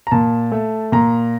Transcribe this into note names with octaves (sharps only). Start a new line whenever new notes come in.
A#5
A#2 A5
A3
A#2 A#5